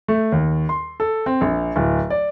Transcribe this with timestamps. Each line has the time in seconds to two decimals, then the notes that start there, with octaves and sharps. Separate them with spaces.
0.08 A3
0.32 D#2
0.69 C6
1.00 A4
1.26 C4
1.41 A#1
1.76 D1
2.10 D5